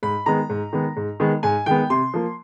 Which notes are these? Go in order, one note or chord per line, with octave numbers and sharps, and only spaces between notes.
G#2 B5
D#3 G#3 B3 A#5
G#2
D#3 G#3 B3
G#2
D#3 G#3 B3
G#2 G#5
D#3 G#3 B3 G5
C3 C6
F3 A#3